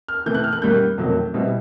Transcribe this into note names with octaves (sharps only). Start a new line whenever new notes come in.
F6
C3 E3 A3 G6
F#6
F6
F#6
F#2 D#3 G3 A#3 G6
F2 C3 D#3 F#3 A3
B2 G3 C4 E4